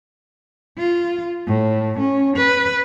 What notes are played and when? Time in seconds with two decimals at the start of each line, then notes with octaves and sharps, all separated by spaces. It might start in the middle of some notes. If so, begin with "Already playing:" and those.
0.78 F4
1.47 A2
1.99 C#4
2.36 B4